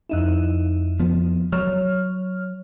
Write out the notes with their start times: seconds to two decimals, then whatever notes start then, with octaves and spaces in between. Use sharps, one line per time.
0.09 F2 D#4 E4
1.00 F3 B3
1.52 F#3 C#5 F6